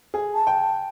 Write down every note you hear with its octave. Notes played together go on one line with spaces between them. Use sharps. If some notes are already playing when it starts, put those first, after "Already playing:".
G#4
A5
G5